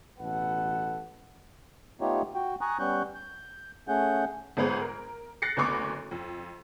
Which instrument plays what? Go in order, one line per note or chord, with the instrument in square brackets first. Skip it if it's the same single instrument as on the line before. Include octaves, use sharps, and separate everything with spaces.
[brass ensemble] A1 B2 A4 B4 F#5
[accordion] A3 B3 D#4 F4 G4 C#5
F#4 G5
G#5 A#5 C#6 D#6 F#6
G3 B3 C#4 C#6 F#6 G6
G6
A3 C#4 G#4 F#5 G6
[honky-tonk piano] G1 G#2 B3 G#4 C5
A#4
F#6 A6 A#6 C7 C#7
F#1 D2 B3 B5 C#6 D6
F2